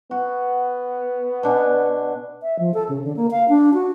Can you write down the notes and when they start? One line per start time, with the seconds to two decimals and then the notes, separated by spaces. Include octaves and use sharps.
0.11 B3 F#4
1.43 B2 D4 G#5
2.43 E5
2.59 F3
2.74 A4
2.89 C#3
3.04 D3
3.16 A#3
3.31 F5
3.49 D4
3.74 F#4